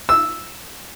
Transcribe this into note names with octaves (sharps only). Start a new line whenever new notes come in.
E6